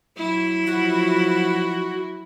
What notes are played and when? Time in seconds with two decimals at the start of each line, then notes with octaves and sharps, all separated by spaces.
0.17 F#3 E4
0.67 F3 F#4